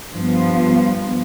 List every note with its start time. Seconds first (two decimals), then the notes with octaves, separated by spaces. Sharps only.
0.13 G2 F3 B3